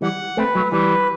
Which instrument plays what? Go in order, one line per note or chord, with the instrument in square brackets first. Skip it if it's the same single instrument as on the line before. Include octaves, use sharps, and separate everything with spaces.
[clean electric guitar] E3 G3 [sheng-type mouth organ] F#5
[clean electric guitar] A3 C4 [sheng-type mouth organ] B4
[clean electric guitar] F#3 A3
[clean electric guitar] E3 G3 [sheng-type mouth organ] B4